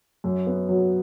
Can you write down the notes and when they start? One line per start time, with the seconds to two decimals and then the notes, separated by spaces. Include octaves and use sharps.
0.24 F#2
0.47 B3
0.69 F#3